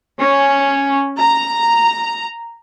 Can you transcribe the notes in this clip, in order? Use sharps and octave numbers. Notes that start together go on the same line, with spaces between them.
C#4
A#5